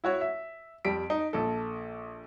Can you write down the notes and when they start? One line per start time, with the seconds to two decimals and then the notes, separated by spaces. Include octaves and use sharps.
0.04 E4 F#4 C#5
0.21 E5
0.85 F2 G3 B6 D7
1.10 D#4
1.33 A#1 A4